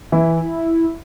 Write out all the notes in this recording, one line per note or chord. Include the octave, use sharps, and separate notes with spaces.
E3 E4